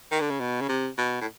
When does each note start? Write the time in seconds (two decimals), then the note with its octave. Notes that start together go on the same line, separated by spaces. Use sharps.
0.11 D#3
0.21 D3
0.30 C#3
0.40 B2
0.61 C#3
0.69 C3
0.98 B2
1.21 A2